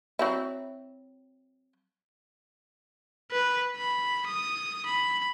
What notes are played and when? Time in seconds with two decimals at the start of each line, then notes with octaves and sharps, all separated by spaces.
0.19 F#3 C4 E4
3.32 B4
3.77 B5
4.27 D#6
4.86 B5